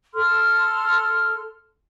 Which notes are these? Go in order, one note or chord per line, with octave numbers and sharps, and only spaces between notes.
A4 C6 F6